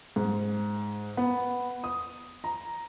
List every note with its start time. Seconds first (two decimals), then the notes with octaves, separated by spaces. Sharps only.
0.16 G#2
1.17 B3
1.84 D#6
2.44 A#5